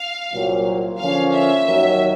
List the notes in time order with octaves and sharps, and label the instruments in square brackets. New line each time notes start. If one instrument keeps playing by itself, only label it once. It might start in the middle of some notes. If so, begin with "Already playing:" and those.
Already playing: [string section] F5
[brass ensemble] C2 A#2 F#3
[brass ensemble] D3 F3 A#3 C#4 [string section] F5
[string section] E5
[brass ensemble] D#2 D#3 F#3